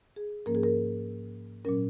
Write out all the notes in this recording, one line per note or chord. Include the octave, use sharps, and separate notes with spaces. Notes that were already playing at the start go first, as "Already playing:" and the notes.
G#4
G#2 F3 A#3 C#4 A#4
G#4
A#4
A#2 F#3 C#4 A#4